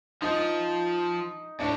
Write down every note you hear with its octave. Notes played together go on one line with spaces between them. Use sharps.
F3 D#4
A2 D4